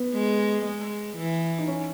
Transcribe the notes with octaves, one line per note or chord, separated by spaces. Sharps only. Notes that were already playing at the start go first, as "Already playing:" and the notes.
Already playing: B3
G#3
G#3
E3
D#4
C#4